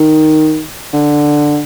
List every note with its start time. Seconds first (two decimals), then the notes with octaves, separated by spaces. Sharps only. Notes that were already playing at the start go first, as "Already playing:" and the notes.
Already playing: D#3
0.93 D3